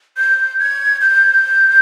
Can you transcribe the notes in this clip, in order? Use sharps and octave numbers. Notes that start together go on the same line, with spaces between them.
G6
G#6
G6